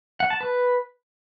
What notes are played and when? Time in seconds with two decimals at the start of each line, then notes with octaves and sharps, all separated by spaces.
0.20 F#5
0.30 A5
0.41 B4